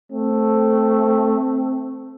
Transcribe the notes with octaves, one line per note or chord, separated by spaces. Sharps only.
A3 C4